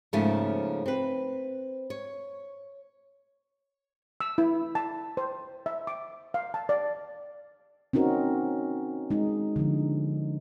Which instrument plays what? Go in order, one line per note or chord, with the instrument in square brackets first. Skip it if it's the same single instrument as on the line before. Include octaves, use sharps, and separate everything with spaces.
[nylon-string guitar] G#2 C#3 F3 A3 A#3 C#4
C4 B4
C#5
[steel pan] E6
E4
A5
C5
E5
D6
F5
A5
D5
[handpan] C4 C#4 D#4 F#4 A#4
G#3 D#4
D3 F3